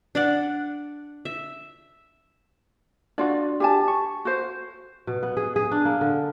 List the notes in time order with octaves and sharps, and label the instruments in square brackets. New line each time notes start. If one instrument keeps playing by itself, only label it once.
[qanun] D4 D5 F#5
E5
[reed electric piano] D4 F#4 [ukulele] F4 D5
[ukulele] G4 G#5 A5
[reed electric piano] C#6
[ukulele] F#4 C5
[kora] B2
B3
G#4
G#4
D4
A#3
D3